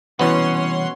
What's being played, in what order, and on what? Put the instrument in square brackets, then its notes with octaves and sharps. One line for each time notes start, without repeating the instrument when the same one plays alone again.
[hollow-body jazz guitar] C2 E3 [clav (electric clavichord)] B2 B3 [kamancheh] C#4 [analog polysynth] C#5 F#5 C6